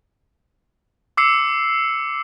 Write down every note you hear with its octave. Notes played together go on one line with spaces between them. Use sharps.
D6 E6 C7 C#7